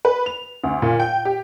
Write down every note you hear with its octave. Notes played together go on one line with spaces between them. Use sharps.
B4
F7
D2
A#2
G5
G4